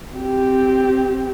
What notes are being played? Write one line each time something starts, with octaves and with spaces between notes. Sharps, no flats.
C4 G4